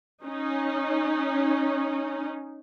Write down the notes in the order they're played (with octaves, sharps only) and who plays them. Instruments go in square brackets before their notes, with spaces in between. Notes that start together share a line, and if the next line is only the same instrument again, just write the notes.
[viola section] C#4 D#4